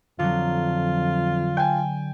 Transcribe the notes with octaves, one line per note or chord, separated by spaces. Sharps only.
F2 D3 F#3 F4
G5 G#5